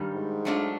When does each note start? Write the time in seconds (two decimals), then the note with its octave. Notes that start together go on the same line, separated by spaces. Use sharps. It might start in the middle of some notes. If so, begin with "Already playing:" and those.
Already playing: G2 D#3 G3
0.13 G#2
0.45 F#3 A3 D4 F4